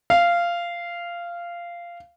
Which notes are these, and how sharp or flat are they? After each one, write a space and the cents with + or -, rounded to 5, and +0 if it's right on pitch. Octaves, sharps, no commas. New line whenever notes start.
F5 -15